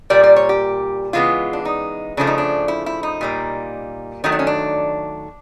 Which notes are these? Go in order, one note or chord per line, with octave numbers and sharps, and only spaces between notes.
A#2 G3 A#3 D5
D5
C#5
G4
C#3 E3 G#3 B3 F4
D4
D#4
C#3 F3 A3 D4
D#4
D4
E4
E4
D#4
A#2 G3 A#3
D#3 F#3 A3 D#4
D4
C#4
D4